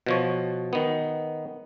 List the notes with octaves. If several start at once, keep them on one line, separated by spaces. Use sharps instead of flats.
B2 F3 C#5
D#3 B3